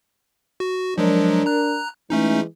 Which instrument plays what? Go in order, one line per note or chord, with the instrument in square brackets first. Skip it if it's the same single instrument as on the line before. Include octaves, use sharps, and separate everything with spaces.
[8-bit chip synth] F#4
[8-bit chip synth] F3 F#3 G#3 [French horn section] D4 A#4
[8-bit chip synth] A#5 F#6
[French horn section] E3 G#3 [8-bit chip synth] A3 C#4 D#4